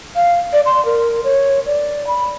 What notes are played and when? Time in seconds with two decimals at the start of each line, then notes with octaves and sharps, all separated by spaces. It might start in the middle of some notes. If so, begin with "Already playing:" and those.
0.16 F5
0.53 D5
0.66 C6
0.85 A#4
1.24 C#5
1.66 D5
2.07 B5